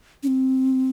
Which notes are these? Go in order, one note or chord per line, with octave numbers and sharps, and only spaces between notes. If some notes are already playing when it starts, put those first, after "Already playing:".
C#4
C4